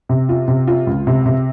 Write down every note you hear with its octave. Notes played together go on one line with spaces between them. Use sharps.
C3
F4
C3
F4
C#2
C3
C3